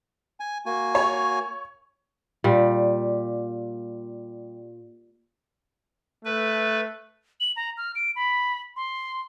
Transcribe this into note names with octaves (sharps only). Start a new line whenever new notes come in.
G#5
A#3 F#4 G#5
C#5
A#2 G3
A3 B4
F#7
A#5
F6
D7
B5
C6